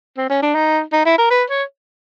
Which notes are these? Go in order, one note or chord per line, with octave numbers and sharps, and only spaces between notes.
C4
C#4
D4
D#4
D#4
E4
A#4
B4
C#5